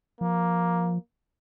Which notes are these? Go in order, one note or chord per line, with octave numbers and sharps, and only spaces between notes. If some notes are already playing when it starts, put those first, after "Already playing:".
F3 A#3